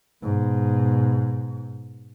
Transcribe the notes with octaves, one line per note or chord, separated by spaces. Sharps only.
G#2 B2